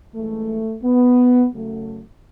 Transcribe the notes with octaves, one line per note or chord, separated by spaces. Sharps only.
F#2 E3 G#3 A3
B3
F#2 C#3 F#3 A3